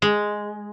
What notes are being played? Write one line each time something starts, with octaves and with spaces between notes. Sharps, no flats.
G#3